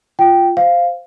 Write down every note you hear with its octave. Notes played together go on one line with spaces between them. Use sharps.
F4 G5
C5 F5